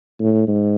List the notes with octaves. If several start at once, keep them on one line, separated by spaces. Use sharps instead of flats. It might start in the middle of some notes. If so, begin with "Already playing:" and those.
A2
G#2